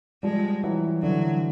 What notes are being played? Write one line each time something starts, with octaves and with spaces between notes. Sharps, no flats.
F3 G3 G#3
E3 F#3
D3 E3 F#3